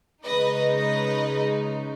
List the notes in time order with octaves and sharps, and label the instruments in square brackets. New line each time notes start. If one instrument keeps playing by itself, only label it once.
[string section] C#3 G#3 D#4 [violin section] B4 D#5
[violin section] B4 D#5